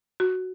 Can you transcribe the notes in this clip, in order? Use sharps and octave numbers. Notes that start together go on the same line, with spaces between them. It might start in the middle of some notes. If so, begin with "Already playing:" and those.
F#4